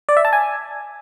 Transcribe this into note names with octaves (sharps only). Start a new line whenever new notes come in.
D5
E5
A5
G#5